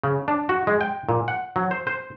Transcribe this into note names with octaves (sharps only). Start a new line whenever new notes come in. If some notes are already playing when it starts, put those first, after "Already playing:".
C#3
D4
F#4
G#3
G5
A#2
F#5
F#3
C5
C5